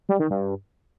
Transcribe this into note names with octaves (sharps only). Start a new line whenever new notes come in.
G3
D#3
G2